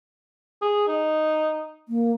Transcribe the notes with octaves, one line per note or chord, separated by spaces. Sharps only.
G#4
D#4
A#3